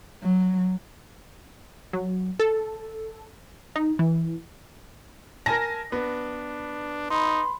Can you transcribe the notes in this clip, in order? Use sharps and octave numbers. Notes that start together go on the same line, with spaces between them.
F#3
F#3
A4
D#4
E3
A#4 G#5 A5 A#6
B3 D4
D#4 B5 C6